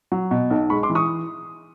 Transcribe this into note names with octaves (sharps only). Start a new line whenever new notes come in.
F#3
B2
B1
G#3 B5 C#6
C6 D6
E3
C#6 D#6